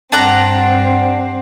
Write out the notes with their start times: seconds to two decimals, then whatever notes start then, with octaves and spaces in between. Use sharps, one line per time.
0.12 G2 C4 D4 F#5 A#5